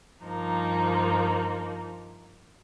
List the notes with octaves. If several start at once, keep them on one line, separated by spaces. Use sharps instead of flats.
G2 F3 A#3 D#4